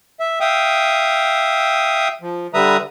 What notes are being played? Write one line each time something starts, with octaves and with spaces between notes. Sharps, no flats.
E5
E5 F5 G5 D#6
F3
D3 G3 B4 E5 A#5 D#6